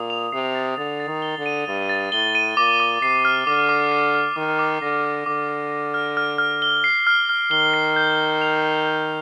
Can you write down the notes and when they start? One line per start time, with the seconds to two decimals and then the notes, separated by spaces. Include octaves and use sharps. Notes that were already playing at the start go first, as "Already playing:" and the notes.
Already playing: A#2 D#6
0.10 F7
0.32 C3 C7
0.55 A6
0.77 D3 A6
1.00 A6
1.08 D#3
1.22 G7
1.38 D3
1.46 D#7
1.68 G2 A6
1.89 A6
2.12 A2 G7
2.35 D#7
2.57 A#2 D6
2.80 D6
3.02 C3 C7
3.25 F6
3.47 D3 D6
3.69 D6
3.92 C7
4.14 F6
4.36 D#3 D6
4.59 D6
4.82 D3 A#6
5.05 F6
5.26 D3 D6
5.49 D6
5.71 A#6
5.94 F6
6.17 F6
6.38 F6
6.62 G7
6.84 C7
7.07 F6
7.29 F6
7.51 D#3 G7
7.74 C7
7.96 G6
8.19 G6
8.41 F7
8.63 C7
8.85 G6